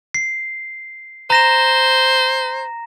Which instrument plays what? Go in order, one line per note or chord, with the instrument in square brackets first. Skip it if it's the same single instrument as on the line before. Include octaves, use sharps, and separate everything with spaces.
[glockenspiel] C7
[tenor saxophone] C5 [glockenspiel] A#5 A#6 E7